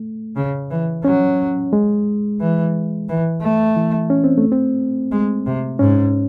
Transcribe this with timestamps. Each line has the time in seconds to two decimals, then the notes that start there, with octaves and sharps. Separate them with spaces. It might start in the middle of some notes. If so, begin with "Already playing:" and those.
Already playing: A3
0.36 C#3
0.71 E3
1.05 F#3 C#4
1.73 G#3
2.41 E3
3.09 E3
3.42 A3
3.76 E3
4.10 C#4
4.24 C4
4.38 A3
4.52 C4
5.12 G#3
5.46 C3
5.79 G#2 C#4